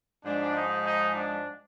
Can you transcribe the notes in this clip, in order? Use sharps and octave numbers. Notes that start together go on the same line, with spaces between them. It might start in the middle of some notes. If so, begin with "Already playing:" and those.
G#2 F3 G#3 D4
D#4
D#4
D4